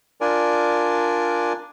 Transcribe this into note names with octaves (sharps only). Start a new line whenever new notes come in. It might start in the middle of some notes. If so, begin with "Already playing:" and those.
D4 F4 A#4 D5 G#5